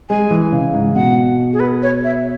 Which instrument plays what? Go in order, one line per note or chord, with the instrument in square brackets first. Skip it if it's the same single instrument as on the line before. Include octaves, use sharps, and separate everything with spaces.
[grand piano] G#3 [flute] G#5
[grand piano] E3
C#3
G#2
[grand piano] B2 [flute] F#5
[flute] G#4
B4
C#5
E5